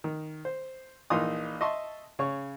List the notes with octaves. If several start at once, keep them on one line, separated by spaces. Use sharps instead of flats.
D#3
C5
A#1 E3 D#4 F4 C6 D#6
D#5 E5 A5 C6 C#6 D#6
C#3 C#5 C#6